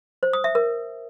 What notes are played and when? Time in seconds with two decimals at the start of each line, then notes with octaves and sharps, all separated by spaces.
0.23 C5
0.33 D#6
0.44 E5
0.55 A#4